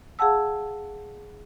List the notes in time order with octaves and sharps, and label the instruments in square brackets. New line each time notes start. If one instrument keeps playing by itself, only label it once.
[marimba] G#4 F5 F#5 A5 E6